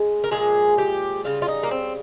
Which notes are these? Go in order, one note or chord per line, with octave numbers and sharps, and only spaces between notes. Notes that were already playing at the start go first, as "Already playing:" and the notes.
Already playing: C#3 G#3
A#4
A#2 F3 G#3 G#4
G4
C#3 G3 F4
F4
D#4
A#3
C4